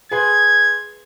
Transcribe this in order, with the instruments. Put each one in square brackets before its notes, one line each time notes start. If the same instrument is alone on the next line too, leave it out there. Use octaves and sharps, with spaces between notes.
[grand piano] G#4 B4 C6 [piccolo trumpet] G#6